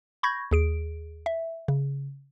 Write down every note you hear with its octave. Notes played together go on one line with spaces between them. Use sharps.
B5 C#6 G6 G#6 A#6
D#2 G#4 D7
E5
C#3